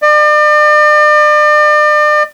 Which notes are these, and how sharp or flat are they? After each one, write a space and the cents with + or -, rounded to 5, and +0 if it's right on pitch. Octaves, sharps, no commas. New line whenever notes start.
D5 +40